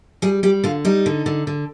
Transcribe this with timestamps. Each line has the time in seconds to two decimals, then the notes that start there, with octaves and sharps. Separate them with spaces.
0.22 G3 G#4
0.43 G3 G4
0.64 D3 F4
0.85 G3 D#4
1.06 D3
1.26 D3
1.47 D3